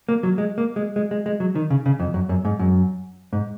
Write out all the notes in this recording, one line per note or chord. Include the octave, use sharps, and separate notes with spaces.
A#3
F#3
G#3
A#3
G#3
G#3
G#3
G#3
F#3
D#3
C#3
C#3
F2
F#2
F#2
G#2
F#2
G#2